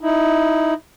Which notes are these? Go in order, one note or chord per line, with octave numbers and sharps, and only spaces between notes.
D#4 E4